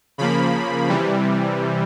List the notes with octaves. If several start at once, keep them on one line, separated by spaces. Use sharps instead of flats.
C#3 F3 A#3 B5
C3 E3 G3